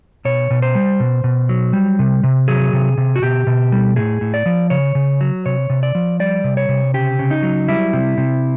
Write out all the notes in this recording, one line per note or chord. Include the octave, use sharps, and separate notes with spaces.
B2 C#5
B2
C5
G3
B2
B2
F#3
G3
C3
C3
F#3 G#4
C3
C3
F#4
B2 G4
B2
G3
A2 G#4
A2
D5
F3
C#3 C#5
C#3
F#3
C3 C#5
C3
D5
F3
G3 D5
C3
C#5
C3
C#3 G4
C#3
D#4
F#3
G3 E4
C3
C3